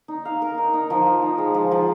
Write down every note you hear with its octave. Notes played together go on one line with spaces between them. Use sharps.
D#4
F5
A#4
D#4
D#4
F3
F3
D#4
G#3
F3
F3